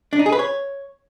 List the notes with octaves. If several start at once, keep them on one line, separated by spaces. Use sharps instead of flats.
D4
D#4
G#4
B4
C#5